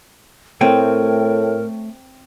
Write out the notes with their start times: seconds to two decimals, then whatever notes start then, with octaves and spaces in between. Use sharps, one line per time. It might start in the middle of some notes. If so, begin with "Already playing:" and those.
0.61 A2 A3 C4 A#4 C#5 G5